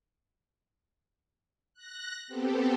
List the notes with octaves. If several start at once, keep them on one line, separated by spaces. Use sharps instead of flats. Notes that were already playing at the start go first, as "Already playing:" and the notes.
F#6 A#6
B3 C4 G4 A4